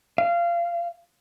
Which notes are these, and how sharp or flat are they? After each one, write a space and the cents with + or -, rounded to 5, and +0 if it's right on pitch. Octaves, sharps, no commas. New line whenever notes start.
F5 -20